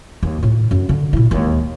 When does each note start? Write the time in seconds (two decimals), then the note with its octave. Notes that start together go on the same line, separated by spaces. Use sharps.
0.23 D#2
0.43 A2 F4
0.71 F#2
0.89 D3
1.13 A#2 E4
1.31 D#2 G#3